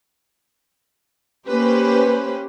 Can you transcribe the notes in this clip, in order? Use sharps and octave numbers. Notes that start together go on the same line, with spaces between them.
A#3 C#4 G4 B4 C5